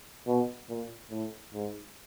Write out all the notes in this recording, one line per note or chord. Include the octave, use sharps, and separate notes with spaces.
B2
A#2
A2
G#2